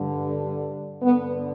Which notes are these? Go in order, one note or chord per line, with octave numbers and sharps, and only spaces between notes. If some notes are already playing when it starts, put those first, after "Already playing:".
Already playing: G2 D3
G2 D3 B3